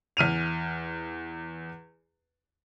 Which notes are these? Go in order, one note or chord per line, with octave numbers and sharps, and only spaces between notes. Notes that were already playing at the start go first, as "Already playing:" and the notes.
E2 F6 D#7 F7